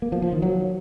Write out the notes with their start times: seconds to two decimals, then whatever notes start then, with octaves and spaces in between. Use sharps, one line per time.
0.02 A#3
0.12 F3
0.22 F3
0.32 D#3
0.42 F#3